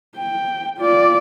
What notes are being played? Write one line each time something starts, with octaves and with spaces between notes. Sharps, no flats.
G5
F4 D5